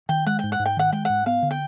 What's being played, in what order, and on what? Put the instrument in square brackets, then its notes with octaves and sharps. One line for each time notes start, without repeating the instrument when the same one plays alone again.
[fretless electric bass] D#3 [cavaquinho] G5
[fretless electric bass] G#3 [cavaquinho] F#5
[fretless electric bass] G#2 [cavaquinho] G5
[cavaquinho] F#5
[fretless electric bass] G#2
[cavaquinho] G5
[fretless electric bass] D#3 [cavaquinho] F#5
[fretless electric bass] G#3 [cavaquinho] G5
[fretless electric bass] G#2 [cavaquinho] F#5
[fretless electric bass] B3 [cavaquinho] F5
[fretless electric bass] D3
[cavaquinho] G5